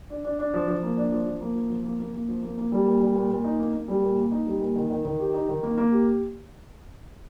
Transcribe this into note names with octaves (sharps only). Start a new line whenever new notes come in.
D4
D4
D4
F3
F3
A#3
D4
F3
F3
A#3
F3
F3
A#3
A#3
A#3
F3
A#3
A#3
G3
A#2
G3
A#2
A#2
D#4
A#3
A#3
G3
A#2
A#3
D#4
G3
A#2
D#3
D#3
D#3
G4
D#4
D#3
A#3
A#3
G4